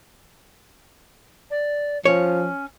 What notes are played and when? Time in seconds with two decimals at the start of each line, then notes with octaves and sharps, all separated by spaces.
1.50 D5
2.05 F3 C#4 C#5